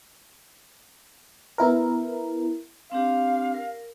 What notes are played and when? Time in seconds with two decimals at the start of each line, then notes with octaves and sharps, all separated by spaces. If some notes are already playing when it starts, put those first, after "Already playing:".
1.58 B3 E4 A#4
2.92 C4 D4 G4 F5
3.54 A#4